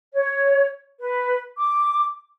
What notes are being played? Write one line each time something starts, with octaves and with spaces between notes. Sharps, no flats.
C#5
B4
D6